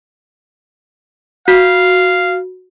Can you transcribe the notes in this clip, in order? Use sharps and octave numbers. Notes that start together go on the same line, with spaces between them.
F#4 F5